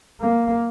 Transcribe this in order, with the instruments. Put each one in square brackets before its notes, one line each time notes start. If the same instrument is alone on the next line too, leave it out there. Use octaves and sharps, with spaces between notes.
[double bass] A#3